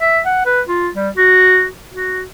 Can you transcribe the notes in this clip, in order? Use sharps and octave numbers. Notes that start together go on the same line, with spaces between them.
E5
F#5
B4
F4
G3
F#4
F#4